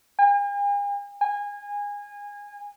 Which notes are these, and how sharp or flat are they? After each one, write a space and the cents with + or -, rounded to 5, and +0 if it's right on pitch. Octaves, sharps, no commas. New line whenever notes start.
G#5 -45
G#5 -25